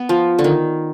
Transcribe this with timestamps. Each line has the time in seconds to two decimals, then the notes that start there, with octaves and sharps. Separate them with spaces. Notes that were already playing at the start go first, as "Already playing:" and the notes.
Already playing: B3
0.09 F3
0.39 D3
0.44 D#3